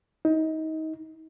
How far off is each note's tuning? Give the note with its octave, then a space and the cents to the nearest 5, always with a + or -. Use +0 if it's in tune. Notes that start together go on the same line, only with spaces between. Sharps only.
D#4 +25